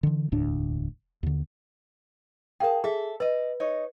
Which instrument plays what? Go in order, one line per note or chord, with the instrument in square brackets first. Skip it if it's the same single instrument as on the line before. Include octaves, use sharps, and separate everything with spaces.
[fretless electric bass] D3 E3
E1 D2 A2 D4
D#2 D3
[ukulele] G#4 A5 [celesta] A#4 F5 G5
[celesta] G#4 [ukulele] A4 E5
[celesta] B4 [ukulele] D5 D#5
[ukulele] D#4 C#5 D#5